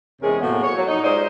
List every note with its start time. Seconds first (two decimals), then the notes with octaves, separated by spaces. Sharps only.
0.22 E2 C3 G#3 C#4 G#4 A#4
0.40 A2 C3 F#3 A#3 B3
0.63 C#5
0.76 F#3
0.88 D#4
1.02 G#3 F4 C5 D5 D#5